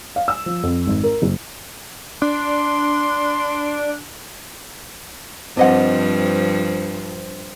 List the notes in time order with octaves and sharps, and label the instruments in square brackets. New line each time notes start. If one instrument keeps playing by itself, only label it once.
[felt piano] F5
E6
F3
F2
G#1
A#4
F#1
[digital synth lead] D4 [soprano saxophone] C6
[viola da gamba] G2 F3 [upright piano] C4 [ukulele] D4 D#5 F#5